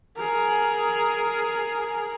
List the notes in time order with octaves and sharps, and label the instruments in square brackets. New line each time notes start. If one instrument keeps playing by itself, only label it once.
[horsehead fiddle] G#4 A#4